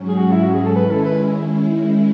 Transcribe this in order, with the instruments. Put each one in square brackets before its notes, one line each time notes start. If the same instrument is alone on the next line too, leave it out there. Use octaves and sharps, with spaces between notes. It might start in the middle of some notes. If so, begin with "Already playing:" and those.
Already playing: [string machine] G#2 F#3 C#4
[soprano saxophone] G#4
F#4
E4
F#4
G#4
A4
[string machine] D#3 G#3 C#4 E4 [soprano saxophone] B4
[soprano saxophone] A4
B4